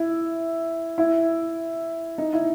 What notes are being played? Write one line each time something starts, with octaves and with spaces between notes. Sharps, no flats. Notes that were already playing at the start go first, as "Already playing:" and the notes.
Already playing: E4
E4
D#4
E4